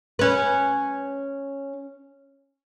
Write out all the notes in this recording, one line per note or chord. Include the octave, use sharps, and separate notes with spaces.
C#4 B4